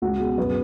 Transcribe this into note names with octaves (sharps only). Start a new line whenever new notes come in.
C#2 F#4
B2 G#4
F#2 B4